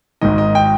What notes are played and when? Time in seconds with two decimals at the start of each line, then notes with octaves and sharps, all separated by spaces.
0.21 G#1 G#2 D#3 D#5
0.38 D#5
0.55 G5